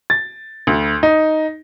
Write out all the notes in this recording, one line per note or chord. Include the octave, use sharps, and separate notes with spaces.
A6
D2
D#4